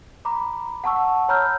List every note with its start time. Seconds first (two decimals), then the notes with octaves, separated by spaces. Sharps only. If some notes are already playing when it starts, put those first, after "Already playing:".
0.25 A#5 B5 D6
0.84 F#5 A5 C#6 E6
1.29 C#5 A#5 B5 E6 F6 G6